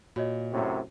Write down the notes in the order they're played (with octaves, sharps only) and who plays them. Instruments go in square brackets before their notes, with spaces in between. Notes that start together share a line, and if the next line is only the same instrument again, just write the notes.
[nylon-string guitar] A#2 [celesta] F#4 C#5 D#5
[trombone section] F#2 A2 C3